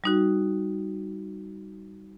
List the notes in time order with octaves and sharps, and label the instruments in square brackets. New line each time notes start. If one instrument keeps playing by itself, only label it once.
[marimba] G3 D#4 F#4